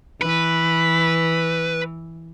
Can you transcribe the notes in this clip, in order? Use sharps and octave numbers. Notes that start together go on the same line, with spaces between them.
E3 B4